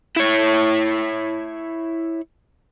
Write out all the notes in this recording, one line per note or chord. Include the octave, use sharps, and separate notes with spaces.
E4 C#5